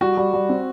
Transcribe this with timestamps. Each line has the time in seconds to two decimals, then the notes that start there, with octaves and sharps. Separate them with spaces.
0.01 G3 F#4
0.17 G3
0.33 G3
0.49 C4